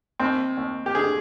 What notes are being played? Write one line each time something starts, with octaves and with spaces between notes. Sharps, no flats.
D#2 C4
D#2
G4
D3 G#4